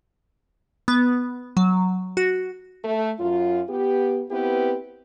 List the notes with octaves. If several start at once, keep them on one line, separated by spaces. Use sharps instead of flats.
B3
F#3
F#4
A3
F#2 F#3 F4
B3 G4
B3 C4 E4 G4 B4